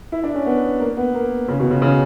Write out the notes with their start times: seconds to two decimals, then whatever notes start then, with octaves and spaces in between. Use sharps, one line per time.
0.12 E4
0.24 D4
0.35 C#4
0.46 B3
0.80 A#3
0.97 B3
1.14 A#3
1.48 C#3
1.60 B2
1.71 C#3
1.82 C#3